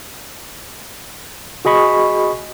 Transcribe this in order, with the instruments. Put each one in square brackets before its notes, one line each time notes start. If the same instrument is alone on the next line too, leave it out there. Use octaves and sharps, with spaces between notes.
[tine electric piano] F#4 G#4 D#5 B5 C#6